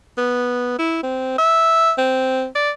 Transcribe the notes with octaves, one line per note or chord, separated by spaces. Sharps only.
B3
E4
C4
E5
C4
D5